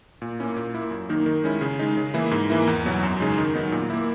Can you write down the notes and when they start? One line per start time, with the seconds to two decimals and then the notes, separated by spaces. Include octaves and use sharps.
0.22 A#2
0.39 A#3 C#4 E4
0.56 A#2
0.74 A#3 E4
0.91 F#2
1.09 D#3 A#3 D#4
1.26 D#3
1.44 G#3 C#4 E4
1.61 C#3
1.79 G#3 D#4
1.97 C#3
2.14 E3 A#3 E4
2.31 G#2
2.50 E3 A#3 E4
2.67 E2
2.85 B2 F#3 B3
3.03 F#2
3.20 C#3 G#3 D#4
3.38 D#3
3.55 F#3 B3 D#4
3.72 A#2
3.90 A#3 E4